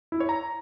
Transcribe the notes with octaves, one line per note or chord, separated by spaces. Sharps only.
E4
C#5
A#5